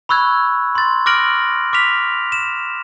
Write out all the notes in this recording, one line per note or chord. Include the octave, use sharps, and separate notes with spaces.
B5 C#6 E6 F#6 G#6
C6 A6
D6 F6 F#6 A#6 D7 F#7
D6 F6 A#6 B6 F7
E7